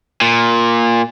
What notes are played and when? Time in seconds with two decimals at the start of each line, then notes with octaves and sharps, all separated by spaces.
0.21 A#2